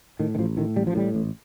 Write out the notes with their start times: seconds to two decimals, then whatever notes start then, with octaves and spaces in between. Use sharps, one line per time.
0.19 A2 D#3
0.35 D#3
0.39 A1 F3
0.57 A2 D#3
0.76 A1 G3
0.87 F3
0.95 A2 G3
1.15 A1